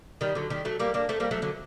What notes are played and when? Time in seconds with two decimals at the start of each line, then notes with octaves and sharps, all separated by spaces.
0.21 D#3 G3
0.35 D3 F#3
0.50 D#3 G3
0.65 F#3 A3
0.80 G3 A#3
0.94 A#3 D4
1.09 A3 C4
1.20 G3 A#3
1.31 F#3 A3
1.42 D3 F#3